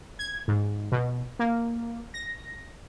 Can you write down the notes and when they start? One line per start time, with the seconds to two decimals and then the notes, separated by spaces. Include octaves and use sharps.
0.19 G#6
0.48 G#2
0.92 B2
1.39 A#3
2.14 A#6